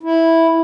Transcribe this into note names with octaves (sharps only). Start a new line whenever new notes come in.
E4